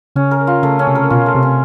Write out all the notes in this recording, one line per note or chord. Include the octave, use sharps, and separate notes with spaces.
C#3 C#4
A#4
F4
C#3 A3
C#4
C3
A#4
B2 F4
A3
C3
C#4